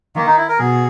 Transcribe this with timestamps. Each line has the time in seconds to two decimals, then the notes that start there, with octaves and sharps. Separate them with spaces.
0.16 D#3 A#3
0.26 D#4
0.37 E4
0.49 A#4
0.59 B2 G#4